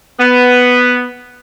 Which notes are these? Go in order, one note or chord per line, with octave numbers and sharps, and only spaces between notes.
B3